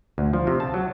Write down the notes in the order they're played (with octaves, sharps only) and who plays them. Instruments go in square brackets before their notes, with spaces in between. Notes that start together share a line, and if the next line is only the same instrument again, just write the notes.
[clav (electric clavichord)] D2
F3
C3
A5
F#3